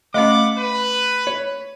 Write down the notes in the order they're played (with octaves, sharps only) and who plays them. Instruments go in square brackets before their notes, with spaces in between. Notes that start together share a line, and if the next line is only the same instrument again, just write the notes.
[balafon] A3 C#4 [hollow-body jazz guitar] D#5 F5 C6 [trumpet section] F#5 B5 D6
[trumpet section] B4
[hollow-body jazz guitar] C#5